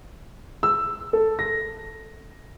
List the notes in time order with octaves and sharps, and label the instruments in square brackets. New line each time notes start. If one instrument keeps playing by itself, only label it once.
[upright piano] E6
A4
A#6